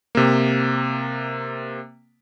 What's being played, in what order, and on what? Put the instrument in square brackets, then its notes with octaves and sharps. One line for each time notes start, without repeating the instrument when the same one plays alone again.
[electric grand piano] C3 A#3